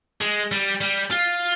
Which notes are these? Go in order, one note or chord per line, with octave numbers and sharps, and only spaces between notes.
G#3
G3
G3
F4